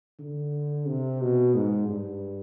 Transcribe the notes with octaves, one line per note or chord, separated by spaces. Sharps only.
D3
C3
B2
G#2
G2